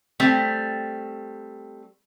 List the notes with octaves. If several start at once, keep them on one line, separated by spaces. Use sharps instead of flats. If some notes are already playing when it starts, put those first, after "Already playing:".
G3 A3 C4